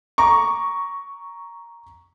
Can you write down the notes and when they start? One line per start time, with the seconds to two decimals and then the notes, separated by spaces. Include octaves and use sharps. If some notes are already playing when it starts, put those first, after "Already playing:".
0.18 A#5 C#6 D6